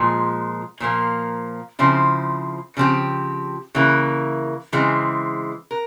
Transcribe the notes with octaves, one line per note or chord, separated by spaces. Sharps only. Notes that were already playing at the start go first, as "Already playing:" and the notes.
Already playing: A#2 F3 G#3
A#2 F3 A#3
C#3 F3 C4 E4
C#3 F3 C4 G4
C#3 E3 A#3 E4
C#3 E3 G#3 C4
A#4